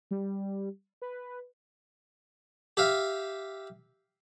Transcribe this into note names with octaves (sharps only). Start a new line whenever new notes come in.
G3
B4
G4 E5 F5